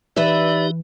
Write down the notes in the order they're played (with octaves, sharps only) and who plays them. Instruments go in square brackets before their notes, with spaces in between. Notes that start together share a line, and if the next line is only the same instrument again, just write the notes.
[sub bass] E3 [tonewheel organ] D#4 G4 [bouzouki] B4 E5 [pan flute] D5